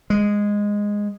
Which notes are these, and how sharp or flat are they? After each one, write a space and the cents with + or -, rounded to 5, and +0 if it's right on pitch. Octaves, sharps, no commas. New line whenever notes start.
G#3 -10